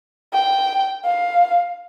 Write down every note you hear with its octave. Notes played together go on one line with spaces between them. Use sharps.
G5
F5